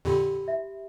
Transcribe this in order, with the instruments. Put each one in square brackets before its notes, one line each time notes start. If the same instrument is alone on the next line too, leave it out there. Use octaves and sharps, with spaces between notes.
[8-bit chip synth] F2 A#2 D3 [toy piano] G4 B5 C6
[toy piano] E5